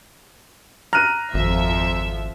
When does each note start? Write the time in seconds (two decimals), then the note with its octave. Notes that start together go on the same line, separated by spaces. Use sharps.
0.93 A#5 F6 F#6 D#7
1.34 G#1 F2 F3 E5